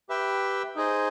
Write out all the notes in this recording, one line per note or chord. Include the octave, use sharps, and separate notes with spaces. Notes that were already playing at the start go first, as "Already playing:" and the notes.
G4 B4 E5 G5
D#4 G#4 C5 D#5